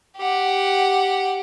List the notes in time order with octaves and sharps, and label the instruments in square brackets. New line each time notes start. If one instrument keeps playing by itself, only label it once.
[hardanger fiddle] G4 F#5